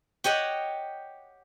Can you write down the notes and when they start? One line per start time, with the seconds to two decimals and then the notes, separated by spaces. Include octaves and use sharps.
0.24 G4 C#5 D#5 F#5